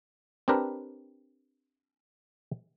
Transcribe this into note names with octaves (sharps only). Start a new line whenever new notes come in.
C4 D4 G4 A#4 B4